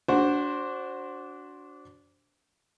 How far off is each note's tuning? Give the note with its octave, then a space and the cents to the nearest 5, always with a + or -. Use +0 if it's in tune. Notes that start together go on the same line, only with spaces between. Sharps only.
D4 -20 F#4 +0 C5 +10